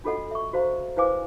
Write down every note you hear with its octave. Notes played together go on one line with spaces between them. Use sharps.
D4 F4 F#4 A4 D#5 F#5
E5 C#6
F#4 C5 F5 A#5
E4 B4 C5 F5 G#5 D6